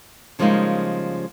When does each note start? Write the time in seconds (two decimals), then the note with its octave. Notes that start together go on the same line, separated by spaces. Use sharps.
0.39 C#3 F3 G3 G#3 A#3 D#4